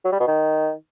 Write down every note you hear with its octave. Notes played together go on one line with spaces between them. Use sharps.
F#3
G3
B2
D#3